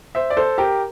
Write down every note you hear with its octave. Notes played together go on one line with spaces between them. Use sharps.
C5 E5
D5
A4 C5
G4 A#4